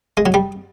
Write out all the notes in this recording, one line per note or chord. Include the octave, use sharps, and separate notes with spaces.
G#3
F#3
G3